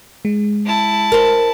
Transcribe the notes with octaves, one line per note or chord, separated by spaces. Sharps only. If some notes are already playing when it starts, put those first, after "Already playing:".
G#3
E4 A5
A#4 C5